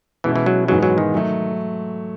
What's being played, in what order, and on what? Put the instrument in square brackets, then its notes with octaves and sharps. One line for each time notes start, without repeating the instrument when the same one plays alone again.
[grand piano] B2 G#3 C#4 E4 [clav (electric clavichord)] E3
[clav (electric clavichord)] E3
F#3
[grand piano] G#2 E3 G#3 B3 [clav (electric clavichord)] F#3
[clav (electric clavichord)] F#3
D#3
[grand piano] F#3 A3